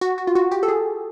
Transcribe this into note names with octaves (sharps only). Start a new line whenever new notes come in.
F#4
F#4
F4
F#4
G4
A4
G#4